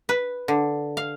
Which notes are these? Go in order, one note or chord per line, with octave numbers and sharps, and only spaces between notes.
B4
D3
F5